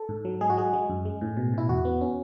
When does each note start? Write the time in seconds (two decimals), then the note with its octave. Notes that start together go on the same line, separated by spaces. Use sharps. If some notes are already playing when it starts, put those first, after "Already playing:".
Already playing: A4
0.09 G#2
0.25 F#3
0.41 G#3 G#4
0.50 F#4
0.57 G#3 G#4
0.73 G#3
0.90 F#2
1.05 G#3
1.21 A2
1.37 B2
1.54 B2 E4
1.69 E2 F#4
1.85 B3
2.01 C#4